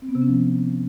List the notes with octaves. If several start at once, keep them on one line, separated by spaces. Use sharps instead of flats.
C4
B3
C3
C#4
F3